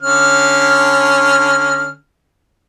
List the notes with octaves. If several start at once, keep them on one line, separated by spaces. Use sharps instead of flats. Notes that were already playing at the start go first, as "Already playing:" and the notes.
D3 C#4 F6